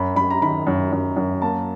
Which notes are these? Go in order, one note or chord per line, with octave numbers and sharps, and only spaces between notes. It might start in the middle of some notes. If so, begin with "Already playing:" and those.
Already playing: F#2 B5
F#2 B5
A#5
D#3 B5
F#2
F#2
F#2
A#3 A5